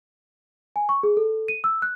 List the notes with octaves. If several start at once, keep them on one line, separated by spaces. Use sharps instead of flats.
G#5
C#6
G#4
A4
D#7
E6
F#6